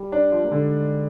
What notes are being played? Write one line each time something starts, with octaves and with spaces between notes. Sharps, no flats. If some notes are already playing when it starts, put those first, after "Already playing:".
Already playing: G3
D4
F3
A#3
D3 G#3